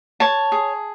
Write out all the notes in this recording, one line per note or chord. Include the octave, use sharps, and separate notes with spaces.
C#5 A5
G#4